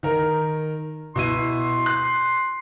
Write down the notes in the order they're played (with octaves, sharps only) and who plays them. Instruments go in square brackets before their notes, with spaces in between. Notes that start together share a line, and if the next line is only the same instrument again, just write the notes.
[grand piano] D#3 A#4
[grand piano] B2 E4 D#7 [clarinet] C6
[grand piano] F#6